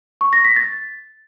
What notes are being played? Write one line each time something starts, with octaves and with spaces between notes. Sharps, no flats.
C#6
A#6
B6
A6